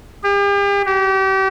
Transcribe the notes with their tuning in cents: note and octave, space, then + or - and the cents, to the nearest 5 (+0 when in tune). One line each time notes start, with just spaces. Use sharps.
G4 +40
G4 -35